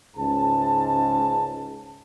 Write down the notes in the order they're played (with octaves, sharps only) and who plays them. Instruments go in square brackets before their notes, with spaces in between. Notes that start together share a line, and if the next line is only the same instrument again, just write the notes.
[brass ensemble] C#2 G#2 A5